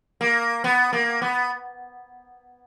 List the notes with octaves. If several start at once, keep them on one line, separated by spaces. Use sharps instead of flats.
A#3
B3
A#3
B3